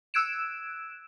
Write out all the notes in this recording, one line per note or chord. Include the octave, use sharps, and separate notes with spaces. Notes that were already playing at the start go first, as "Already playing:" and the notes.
E6 F#6 G#6 D7 E7